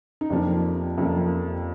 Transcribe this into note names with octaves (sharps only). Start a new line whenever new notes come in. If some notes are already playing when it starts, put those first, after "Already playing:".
D#4
F2 C3 F3 A#3 D4
F2 C3 F3 A#3